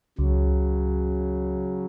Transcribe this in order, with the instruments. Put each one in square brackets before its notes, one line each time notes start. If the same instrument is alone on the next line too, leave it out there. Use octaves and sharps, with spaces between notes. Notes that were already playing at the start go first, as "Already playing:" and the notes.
[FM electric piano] C#2 [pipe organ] C#3 F#3